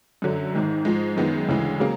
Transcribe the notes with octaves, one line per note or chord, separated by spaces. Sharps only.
F#2 D3 F#3
G#1 G#2 D#3 G#3
G#2 F3 G#3
F#2 D#3 G#3 B3
D2 C#3 E3 G#3
C#3 F#3 A#3